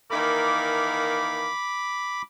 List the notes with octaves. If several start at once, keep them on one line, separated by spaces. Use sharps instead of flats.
D#3 E3 A#3 B5 D6